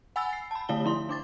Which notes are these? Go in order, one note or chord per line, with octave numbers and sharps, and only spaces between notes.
F#5 G#5 B5 E6 A6
C7
A5 B5
D3 A3 E4 F5 A5 G7
F3 E4 C6
D4 D6 A6